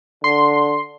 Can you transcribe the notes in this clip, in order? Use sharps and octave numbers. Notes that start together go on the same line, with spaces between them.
D3 C6